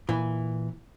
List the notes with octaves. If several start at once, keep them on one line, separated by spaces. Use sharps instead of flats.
A#2 E3